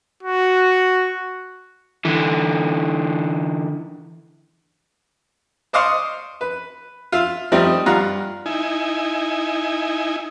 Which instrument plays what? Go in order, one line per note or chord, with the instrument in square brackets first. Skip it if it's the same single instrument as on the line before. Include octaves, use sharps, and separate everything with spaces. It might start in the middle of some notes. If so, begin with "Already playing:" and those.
[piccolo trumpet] F#4
[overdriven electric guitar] D3 E3
[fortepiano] C5 D5 D#5 F5 C6 C#6
B4
F4 E5
F3 G3 A3 C4 D#4
G2 G3 F4 F#5 A#5
[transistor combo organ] D#4 E4 G#5